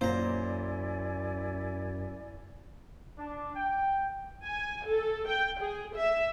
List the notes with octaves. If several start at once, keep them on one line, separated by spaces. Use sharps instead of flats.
F#2 A#2 E4 C5 D5 G#5 A#5
D4
G5
G#5
A4
G5
G#4
E5